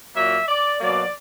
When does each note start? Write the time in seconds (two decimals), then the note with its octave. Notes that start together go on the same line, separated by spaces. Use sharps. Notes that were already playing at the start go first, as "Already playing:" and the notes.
0.15 A#2 F#3 A#3 E5
0.48 D5
0.81 B2 F#3 A#3 D5